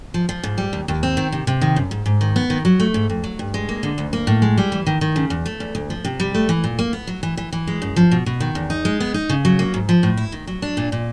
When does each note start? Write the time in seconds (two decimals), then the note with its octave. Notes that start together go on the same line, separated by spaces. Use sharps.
0.14 F3
0.29 F3
0.43 G#2
0.58 G3
0.73 D#2
0.88 D#2
1.03 C4
1.17 D#3
1.32 C3
1.47 C3
1.61 D#3
1.76 F#2
1.91 G#2
2.06 G#2
2.21 D#3
2.36 B3
2.50 D#3
2.65 F#3
2.80 A3
2.94 G#2
3.10 F2
3.24 F#3
3.39 G2
3.54 G#3
3.69 A#3
3.83 D3
3.98 D2
4.13 A#3
4.27 A2
4.42 G#3
4.58 G3
4.72 E3
4.86 D#3
5.01 D#3
5.16 C#3
5.30 E2
5.46 A3
5.60 E2
5.75 D2
5.90 F3
6.05 C3
6.20 G3
6.34 A3
6.49 E3
6.64 A#2
6.79 A#3
6.93 B3
7.07 F#3
7.23 E3
7.37 E3
7.52 E3
7.67 G#3
7.82 F#2
7.96 F3
8.11 B2
8.26 B2
8.40 D#3
8.55 E2
8.70 D#4
8.85 G#3
9.00 B3
9.14 D#4
9.29 C#3
9.45 F#3
9.59 A#3
9.74 G#2
9.89 F3
10.03 A2
10.17 E4
10.32 D#3
10.47 F#3
10.62 D4
10.77 A#2
10.92 A#2